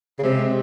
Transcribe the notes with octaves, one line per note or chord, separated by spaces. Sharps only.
C#3
C3 G#3
C4